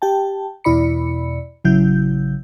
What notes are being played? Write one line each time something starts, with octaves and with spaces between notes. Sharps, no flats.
G4 G5 A5
E2 B2 E4 D5 B5 C#7
A1 C#3 F#3 E4 G6